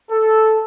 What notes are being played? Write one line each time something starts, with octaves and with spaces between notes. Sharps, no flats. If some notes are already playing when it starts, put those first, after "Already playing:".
A4